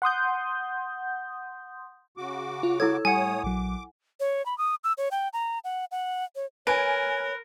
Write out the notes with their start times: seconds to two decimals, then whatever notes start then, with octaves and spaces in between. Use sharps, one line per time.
0.02 F#5 C6 D#6 G6
2.17 C#3 F#4 D6
2.63 F4
2.80 E4 A4 C#5 E6 G#6
3.05 A2 G3 C#5 F#5 G#5 D#6
3.43 A#1 F#3 D6
4.20 C#5
4.46 B5
4.58 D#6
4.84 E6
4.98 C#5
5.11 G5
5.33 A#5
5.64 F#5
5.91 F#5
6.36 C#5
6.67 A#4 B4 C#5 G#5 D7